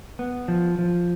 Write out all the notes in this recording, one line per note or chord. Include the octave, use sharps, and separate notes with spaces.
B3
F3
F3